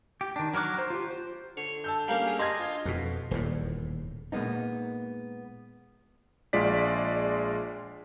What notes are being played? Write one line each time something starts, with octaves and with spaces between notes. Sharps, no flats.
G4
D#3 D4
F#3 A#4 C#5 D6 F#6
C5
F4 G4
C5
D3 C#5
A5 E6 G6
G3 A#3 C#4 F5 A#5
G#4
G3 D4 D#5 C6 G#6
F4
F2 B2
D#1 E2 A2
A#2 G#3 A#3 B3 D#4
A#1 G#3 F4 D5 B6